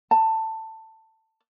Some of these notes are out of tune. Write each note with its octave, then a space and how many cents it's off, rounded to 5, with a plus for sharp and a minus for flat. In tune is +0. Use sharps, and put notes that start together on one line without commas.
A5 +15